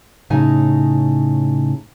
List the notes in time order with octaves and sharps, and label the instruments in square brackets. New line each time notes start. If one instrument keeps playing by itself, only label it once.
[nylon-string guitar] A2 C#3 D#4 G#5